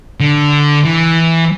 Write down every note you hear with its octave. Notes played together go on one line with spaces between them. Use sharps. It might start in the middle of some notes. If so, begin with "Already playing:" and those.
D3
E3